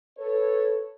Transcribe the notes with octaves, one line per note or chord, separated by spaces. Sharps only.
A4 B4 C#5